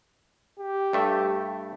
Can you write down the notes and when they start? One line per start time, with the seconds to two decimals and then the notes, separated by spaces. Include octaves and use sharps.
0.59 G4
0.93 G2 A3 E5